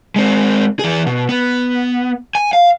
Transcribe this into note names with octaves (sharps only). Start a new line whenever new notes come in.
G#3 C4
E3 G#4
B2
B3
G#5
F5